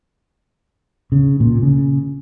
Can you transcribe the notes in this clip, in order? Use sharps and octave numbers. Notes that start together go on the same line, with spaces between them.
C#3
A#2
C#3